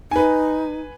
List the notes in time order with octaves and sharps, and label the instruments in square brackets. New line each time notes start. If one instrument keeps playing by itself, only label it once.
[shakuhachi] D#4 [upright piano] B4 G#5